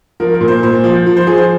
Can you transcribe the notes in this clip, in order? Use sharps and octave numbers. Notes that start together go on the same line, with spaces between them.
F3 A#4
A#4
A#2
C5
A#2 C5
F3
F3
C5
F3 G#4
C5